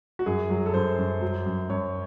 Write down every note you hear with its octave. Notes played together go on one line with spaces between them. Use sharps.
F#4
F#2 G#4
F#3
A4
F#2 C5
F#2
F#3
F#2
F#2 C#5